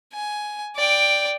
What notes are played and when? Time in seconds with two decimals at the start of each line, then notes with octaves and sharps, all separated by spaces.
0.13 G#5
0.76 D5 G5